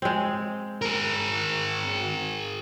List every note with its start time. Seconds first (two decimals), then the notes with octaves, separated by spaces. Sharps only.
0.02 G#3 C4
0.82 G#4 A#4